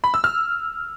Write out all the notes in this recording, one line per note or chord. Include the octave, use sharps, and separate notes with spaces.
B5
E6
F6